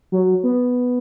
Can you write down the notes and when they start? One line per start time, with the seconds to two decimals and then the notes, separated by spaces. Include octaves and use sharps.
0.12 F#3
0.43 B3